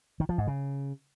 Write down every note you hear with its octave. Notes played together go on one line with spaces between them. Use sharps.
D#3
F3
G#2
C#3